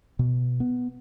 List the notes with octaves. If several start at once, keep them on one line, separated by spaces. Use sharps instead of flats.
B2
B3